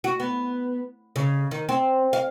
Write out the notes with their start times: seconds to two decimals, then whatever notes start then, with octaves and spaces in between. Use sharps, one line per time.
0.04 F#4
0.20 B3
1.16 C#3
1.51 D#3
1.69 C4
2.13 F5